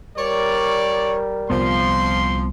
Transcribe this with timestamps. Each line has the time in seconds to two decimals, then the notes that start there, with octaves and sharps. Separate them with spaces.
0.18 G3 A#4 C#5 D5
1.50 C2 F3 B3 C6